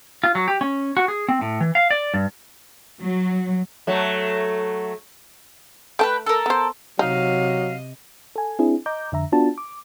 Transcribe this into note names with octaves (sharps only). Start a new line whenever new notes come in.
F4
F#3
G4
C#4
F#4
G#4
C4
A2
E3
F5
D5
G2
F#3
F#3 A3
A3 B4 G5 A5
A4 A#4
B3 C5
C3 F#3 D#4 D#5 F5
A4 G#5
C4 D4 E4 G#4
D#5 A#5 D6 G6
F2 D3 E5 A#5
B3 D4 F4 F#4 A5
D6